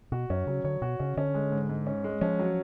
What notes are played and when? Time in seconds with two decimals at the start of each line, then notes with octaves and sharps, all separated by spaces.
0.12 B2 F#4
0.30 F#2 C#4
0.47 C#3 F#3
0.64 D3 C#5
0.82 B2 F#4
1.00 C#3 C#4
1.17 D3 C#4
1.34 G#3
1.52 G#2
1.69 G#2
1.87 C#4
2.04 G#3
2.21 F3 C#4
2.39 F#3